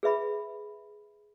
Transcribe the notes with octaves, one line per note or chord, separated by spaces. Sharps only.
G#4 B4 E5 B5